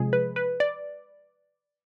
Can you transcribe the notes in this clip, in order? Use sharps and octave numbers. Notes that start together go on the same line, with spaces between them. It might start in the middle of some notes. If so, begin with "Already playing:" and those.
Already playing: C3 F3 G#3 G#4
B4
B4
D5